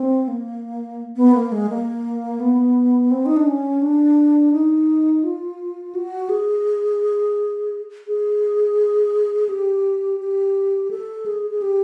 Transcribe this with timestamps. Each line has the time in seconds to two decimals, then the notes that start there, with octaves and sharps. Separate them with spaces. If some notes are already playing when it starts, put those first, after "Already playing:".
Already playing: C4
0.28 A#3
1.16 B3
1.34 A#3
1.52 G#3
1.70 A#3
2.40 B3
3.11 C4
3.26 D#4
3.36 D4
3.47 C#4
3.82 D4
4.53 D#4
5.24 F4
5.95 F#4
6.29 G#4
8.07 G#4
9.49 G4
10.20 G4
10.91 A4
11.26 G#4
11.51 G#4
11.62 G4